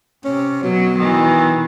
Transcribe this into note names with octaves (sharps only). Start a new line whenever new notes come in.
C3 C#4
B2 F#3
D#3 E3